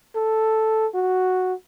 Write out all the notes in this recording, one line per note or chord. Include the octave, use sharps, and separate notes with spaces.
A4
F#4